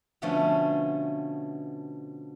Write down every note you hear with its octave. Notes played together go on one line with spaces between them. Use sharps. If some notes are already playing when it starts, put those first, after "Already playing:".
B2 D3 F3 A3 C#4